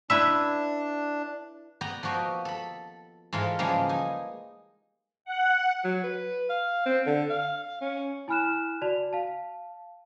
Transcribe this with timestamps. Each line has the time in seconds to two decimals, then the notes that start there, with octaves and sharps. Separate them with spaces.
0.10 D4 E4 B4 E5
1.81 B3 D5 G5 A#5
2.03 F3 A#3 F#4 G4 D#5
2.45 A4 B5
3.33 G#2 E3 F4 A4 A#4
3.59 C#3 E3 F3 G3 G#3 A#3
3.89 D#4 G#5
5.25 F#5
5.84 F#3
6.03 B4
6.49 F5
6.86 C4
7.06 D3
7.30 F5
7.81 C#4
8.28 E4 G#5 B5 F6 F#6 E7
8.82 F#4 D5 A5 F7
9.13 F5 A5